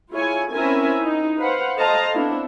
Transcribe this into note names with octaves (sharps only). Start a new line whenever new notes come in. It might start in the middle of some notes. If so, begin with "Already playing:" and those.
E4 F4 G#4 C#5 G#5
C4 C#4 E4 A#4 E5 G#5
D#4 E4
B4 C5 F5 F#5
A4 C5 D#5 F5 A5 A#5
B3 C4 D4 E4